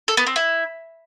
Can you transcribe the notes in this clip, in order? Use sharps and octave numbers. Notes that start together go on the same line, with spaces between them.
A4
B3
C4
E4